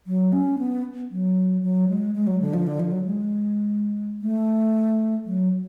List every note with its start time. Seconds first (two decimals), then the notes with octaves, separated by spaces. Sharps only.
0.07 F#3
0.33 C#4
0.59 B3
1.11 F#3
1.62 F#3
1.89 G#3
2.15 G#3
2.27 F#3
2.40 D3
2.54 F3
2.67 D3
2.80 F3
2.92 F#3
3.05 G#3
4.22 A3
5.25 F#3